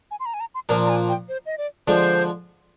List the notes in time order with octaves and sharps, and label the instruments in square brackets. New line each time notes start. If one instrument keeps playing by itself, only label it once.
[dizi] G#5
C6
A#5
G#5
A#5
C6
[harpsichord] A#2 F3 A#3 D4 [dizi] A#5
[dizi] A#5
G#5
G5
C5
D#5
D5
[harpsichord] D3 F3 G#3 D4 [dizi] C5